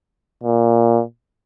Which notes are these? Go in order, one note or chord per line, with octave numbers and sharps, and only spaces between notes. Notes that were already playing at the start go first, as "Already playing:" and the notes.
A#2